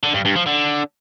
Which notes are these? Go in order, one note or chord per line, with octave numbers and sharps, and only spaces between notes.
D3
G2
G2
F3
D3